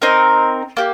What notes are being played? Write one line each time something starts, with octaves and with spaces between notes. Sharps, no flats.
C4 D#4 A#4
A#3 G4